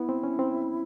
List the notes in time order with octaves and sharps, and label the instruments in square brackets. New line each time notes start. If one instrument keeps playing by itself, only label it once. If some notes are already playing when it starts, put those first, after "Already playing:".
Already playing: [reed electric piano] B3 [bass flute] E4
[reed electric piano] C4
C#4
C4